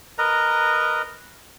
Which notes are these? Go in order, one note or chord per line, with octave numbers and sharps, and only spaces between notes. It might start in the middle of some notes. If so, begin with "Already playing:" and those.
A#4 B4 D#5 A#5